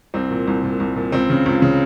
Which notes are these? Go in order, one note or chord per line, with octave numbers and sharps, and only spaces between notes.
C2 C4
A#2
C2
A#2
C2
A#2
C#2 C4
C#3
C#2
C#3